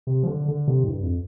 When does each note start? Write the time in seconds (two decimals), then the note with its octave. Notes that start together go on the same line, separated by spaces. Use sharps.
0.07 C3
0.23 F3
0.27 D3
0.48 D3
0.68 C3
0.84 A2
0.89 G2
1.02 F2